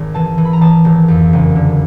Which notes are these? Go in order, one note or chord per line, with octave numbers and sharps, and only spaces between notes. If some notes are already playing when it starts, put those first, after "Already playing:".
Already playing: G#1
E3 A5
E3
B5
A#5
E3 A5
G#1
F2
F#1
D3